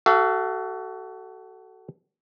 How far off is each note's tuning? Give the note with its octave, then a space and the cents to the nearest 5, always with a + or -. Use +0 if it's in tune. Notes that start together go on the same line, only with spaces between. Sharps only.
F#4 +30 A4 +0 F5 -30